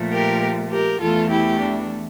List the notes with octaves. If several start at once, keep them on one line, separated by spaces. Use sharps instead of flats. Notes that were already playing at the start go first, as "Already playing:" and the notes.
Already playing: A#2 F3 A3
G4 A#4
G4 A#4
E2 E3 A3 F4 A4
E4 G4
D4